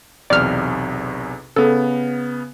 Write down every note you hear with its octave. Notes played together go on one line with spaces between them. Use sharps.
B1 E2 C3 D5 F6
C#3 B3 A4